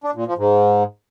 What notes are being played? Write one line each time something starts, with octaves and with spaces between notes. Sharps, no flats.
D4
A#2
F3
G#2